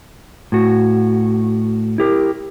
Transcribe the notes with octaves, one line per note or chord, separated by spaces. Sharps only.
A2 F#4
E4 G4 A#4